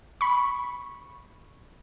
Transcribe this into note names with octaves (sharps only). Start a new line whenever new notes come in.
B5 C#6